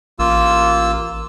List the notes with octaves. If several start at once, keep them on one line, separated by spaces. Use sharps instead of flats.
A1 A#3 F4 E6